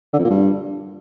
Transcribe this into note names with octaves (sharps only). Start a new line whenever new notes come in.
D3
F2
A#2
G2